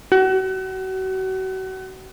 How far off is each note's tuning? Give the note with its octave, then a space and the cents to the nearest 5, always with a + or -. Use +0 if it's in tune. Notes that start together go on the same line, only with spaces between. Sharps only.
F#4 +35